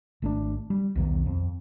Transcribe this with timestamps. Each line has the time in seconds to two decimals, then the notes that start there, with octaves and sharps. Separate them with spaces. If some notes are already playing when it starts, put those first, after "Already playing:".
0.22 G#1 A3 D4
0.70 G3
0.96 B1 E2 D#3
1.26 F2